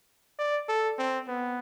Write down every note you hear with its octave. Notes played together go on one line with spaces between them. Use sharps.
D5
A4
C4
B3